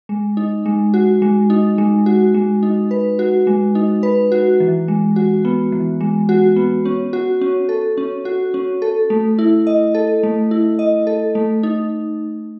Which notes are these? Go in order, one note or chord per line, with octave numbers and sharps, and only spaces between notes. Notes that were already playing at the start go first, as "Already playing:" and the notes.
G#3
D#4
G#3
F#4
G#3
D#4
G#3
F#4
G#3
D#4
B4
F#4
G#3
D#4
B4
F#4
E3
G#3
F#4
B3
E3
G#3
F#4
B3
C#4
F#4
C#4
A4
C#4
F#4
C#4
A4
A3
E4
D#5
A4
A3
E4
D#5
A4
A3
D#4